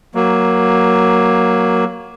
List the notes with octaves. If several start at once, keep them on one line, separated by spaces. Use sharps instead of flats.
F#3 A#3